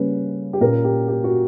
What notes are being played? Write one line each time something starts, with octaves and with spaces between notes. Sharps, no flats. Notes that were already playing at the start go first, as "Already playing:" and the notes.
Already playing: C#3 G3 A#3 C#4 B4
G4
A#2 A#3 C#4 A#4
G4
G4
F#4